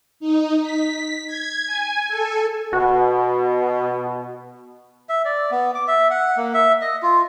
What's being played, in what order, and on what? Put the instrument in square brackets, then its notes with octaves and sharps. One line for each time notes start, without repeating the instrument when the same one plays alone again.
[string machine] D#4
B6
G#6
G#5
A4
[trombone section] B2 [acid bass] F#4
[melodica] E5
D5
B3
D6
E5
F#5
A#3
E5
D#5
F4